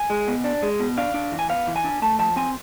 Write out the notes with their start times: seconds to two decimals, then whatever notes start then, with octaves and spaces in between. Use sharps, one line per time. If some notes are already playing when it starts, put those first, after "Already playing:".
Already playing: G#5
0.10 G#3
0.28 B2
0.44 D4
0.62 G#3
0.80 B2
0.97 D4 F5
1.14 D4
1.32 E3
1.39 G#5
1.49 B3 F5
1.67 E3
1.76 G#5
1.84 D4
2.02 A3 A5
2.19 F3 A5
2.36 C4 G#5